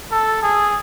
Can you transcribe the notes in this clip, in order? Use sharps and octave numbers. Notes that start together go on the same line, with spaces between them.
A4
G#4